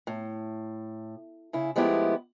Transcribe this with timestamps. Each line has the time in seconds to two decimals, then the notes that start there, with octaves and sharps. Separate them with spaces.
0.07 A2
1.53 C#3 E4
1.76 F3 G#3 A3 B3 E4 G4